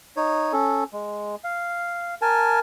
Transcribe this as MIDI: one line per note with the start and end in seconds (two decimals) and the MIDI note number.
0.17 0.53 63
0.17 0.53 73
0.53 0.84 61
0.53 0.84 69
0.93 1.35 56
1.44 2.15 77
2.22 2.60 70
2.22 2.60 80
2.22 2.60 81